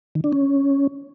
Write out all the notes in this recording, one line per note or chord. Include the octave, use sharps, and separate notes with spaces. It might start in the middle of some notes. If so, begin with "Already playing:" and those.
D#3
D4
C#4